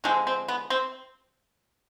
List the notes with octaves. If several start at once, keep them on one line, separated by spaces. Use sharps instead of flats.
D3 F3 G#3 C4
C4
B3
C4